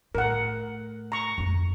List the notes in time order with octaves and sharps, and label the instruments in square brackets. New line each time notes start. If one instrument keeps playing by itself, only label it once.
[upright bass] A2 [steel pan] A#4 F#5
[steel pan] A#5 C#6
[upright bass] F2 G#3